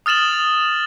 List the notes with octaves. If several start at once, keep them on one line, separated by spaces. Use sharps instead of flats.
D#6 F6 A6 E7 F#7